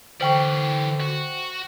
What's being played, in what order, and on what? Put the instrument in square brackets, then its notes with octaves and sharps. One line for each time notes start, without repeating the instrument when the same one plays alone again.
[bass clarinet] D3 [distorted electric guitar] E3 G4 [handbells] C5 G5 C#6
[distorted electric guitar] F#4